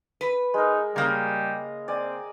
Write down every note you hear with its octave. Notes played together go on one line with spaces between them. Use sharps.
B4
G#3 D#4 A#4
C#3 G3 A#3 A#5 D#6
C4 D5 G#5